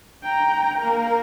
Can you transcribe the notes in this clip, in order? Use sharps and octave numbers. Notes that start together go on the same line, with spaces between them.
G5 A#5
A#3 A#4